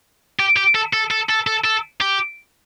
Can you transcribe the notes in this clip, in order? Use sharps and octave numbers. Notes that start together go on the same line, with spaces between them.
G4
G4
A4
A4
A4
A4
A4
A4
G4